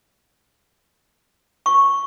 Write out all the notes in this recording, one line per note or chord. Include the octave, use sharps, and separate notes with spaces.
C#6